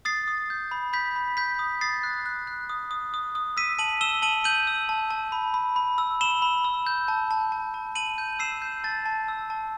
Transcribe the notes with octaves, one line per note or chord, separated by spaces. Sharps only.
D#6 A6 C7
D#6
G6
B5
B5 G6 B6
B5
G6 B6
D#6
D#6 A6 C7
F#6
F#6
F#6
D#6
D#6
D#6
D#6
E6 B6 D#7
A5 D#7 F#7
E6 E7 G7
A5 D#7 F#7
G6 D#7 F#7
E6
A5
A5
B5
B5
B5
E6
B5 E7 G7
B5
E6
G6
A5
A5
A5
A5
A5 D#7 F#7
G6
E6 C7 E7
G6
A5 A6
A5
E6
A5